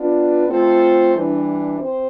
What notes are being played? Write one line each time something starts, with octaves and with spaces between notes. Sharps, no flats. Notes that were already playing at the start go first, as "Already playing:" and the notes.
Already playing: B3 D4 F4 B4 D5
A3 C4 F4 A4 C5
E3 G3 D4
C4 G4 C5